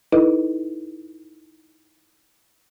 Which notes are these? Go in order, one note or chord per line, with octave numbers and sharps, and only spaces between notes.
D#4 E4 A4 B4 D#5